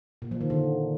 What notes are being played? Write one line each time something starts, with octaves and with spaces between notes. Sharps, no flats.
A#2
F3
D#3
D3